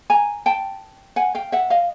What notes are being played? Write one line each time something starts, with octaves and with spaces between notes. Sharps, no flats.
G#5 A#5
G5 A5
F#5 G#5
F5 G5
E5 F#5
D#5 F5